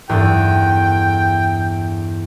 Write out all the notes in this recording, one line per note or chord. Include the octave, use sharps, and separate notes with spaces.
E2 G2 A4 G5